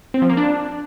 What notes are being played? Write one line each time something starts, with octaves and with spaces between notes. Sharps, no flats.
C4
F3
A#3
D4